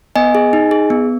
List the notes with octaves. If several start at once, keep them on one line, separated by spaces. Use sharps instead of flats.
B3 D#5 G#5
G#4
D#4
G#4
B3